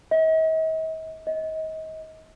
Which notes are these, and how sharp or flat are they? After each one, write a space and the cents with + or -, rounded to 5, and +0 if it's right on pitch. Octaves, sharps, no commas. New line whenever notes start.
D#5 +45
D#5 +30